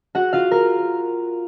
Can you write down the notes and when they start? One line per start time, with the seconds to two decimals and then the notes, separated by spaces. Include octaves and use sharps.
0.15 F#4 F#5
0.33 F4 F5
0.51 A#4